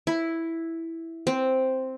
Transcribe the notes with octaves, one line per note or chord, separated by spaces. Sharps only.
E4
C4